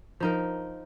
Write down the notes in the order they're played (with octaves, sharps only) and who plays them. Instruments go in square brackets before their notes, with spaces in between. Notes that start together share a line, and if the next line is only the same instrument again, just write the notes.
[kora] F3 D#4 A#4